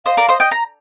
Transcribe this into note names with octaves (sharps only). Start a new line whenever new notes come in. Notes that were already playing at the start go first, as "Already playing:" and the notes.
C5 D#5 F5
A#4 D5
C5 D#5
D#5 G5
A#5